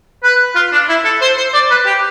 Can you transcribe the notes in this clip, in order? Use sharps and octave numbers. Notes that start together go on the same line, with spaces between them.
B4
F4
D4
E4
A4
C5
C5
D5
B4
G4